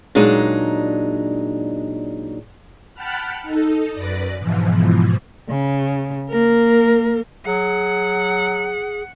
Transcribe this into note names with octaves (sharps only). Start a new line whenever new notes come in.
A#2 F#3 G#3 D4 D#4
F#5 G5 A5 B5 F6 F#6
D#4 A4
F#2 B4 D5 A#6
G#2 B2 E3 F3
C#3
A#3 A#4
F#3 G#4 F#5